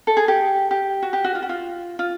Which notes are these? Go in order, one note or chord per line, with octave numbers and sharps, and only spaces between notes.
A4
G#4
G4
G4
F#4
G4
F#4
F4
F#4
F4
F4